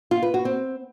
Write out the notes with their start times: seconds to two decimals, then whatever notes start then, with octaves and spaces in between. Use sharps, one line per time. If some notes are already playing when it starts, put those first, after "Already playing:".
0.11 F4
0.23 B4
0.34 F#4
0.45 C4